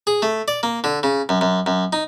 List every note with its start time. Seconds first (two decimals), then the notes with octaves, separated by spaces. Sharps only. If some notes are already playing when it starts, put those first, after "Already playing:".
0.07 G#4
0.22 A3
0.48 D5
0.63 A#3
0.84 D3
1.03 C#3
1.29 F#2
1.41 F#2
1.66 F#2
1.93 D#4